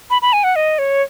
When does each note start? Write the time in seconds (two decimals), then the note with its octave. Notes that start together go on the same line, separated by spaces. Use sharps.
0.10 B5
0.22 B5
0.33 G#5
0.44 F#5
0.56 D#5
0.79 C#5